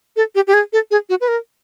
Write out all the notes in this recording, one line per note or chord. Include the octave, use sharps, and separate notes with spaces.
A4
G4
G4
G#4
A4
G#4
F#4
B4
A#4